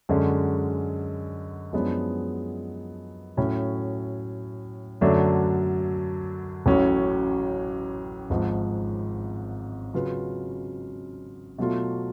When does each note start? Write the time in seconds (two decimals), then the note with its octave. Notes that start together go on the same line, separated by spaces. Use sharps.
0.09 F#2 D3 G#3 C#4
1.73 F#2 F3 G#3 B3 D4
3.37 A2 F#3 C#4
5.01 F#2 D3 F#3 A3 D4
6.66 A1 A2 F#3 C#4
8.30 G#1 G#2 F3
9.94 C#3 F#3 C#4 F4 B4
11.58 B2 F#3 A3 F4